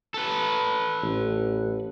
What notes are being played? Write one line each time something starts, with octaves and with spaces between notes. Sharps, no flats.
A4 B4
A1